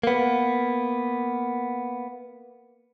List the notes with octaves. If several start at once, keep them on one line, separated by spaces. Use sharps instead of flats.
A#3 B3